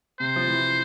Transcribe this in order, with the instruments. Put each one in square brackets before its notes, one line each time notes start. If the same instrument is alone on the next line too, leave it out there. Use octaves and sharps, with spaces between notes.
[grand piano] C3 [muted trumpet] C5
[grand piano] F3
E3